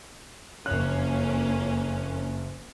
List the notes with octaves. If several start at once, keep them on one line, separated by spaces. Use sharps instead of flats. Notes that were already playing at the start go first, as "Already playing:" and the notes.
F#1 F2 A#3 C#4 F#6